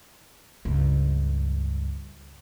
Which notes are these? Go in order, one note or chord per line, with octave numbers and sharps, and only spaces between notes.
C#2 G2